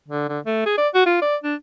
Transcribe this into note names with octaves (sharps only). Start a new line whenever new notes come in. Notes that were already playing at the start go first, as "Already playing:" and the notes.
D3
D3
A3
G#4
D5
F#4
F4
D5
D4